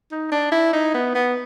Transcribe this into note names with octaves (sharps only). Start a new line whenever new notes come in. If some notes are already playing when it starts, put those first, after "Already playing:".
D#4
D4
E4
D#4
B3
B3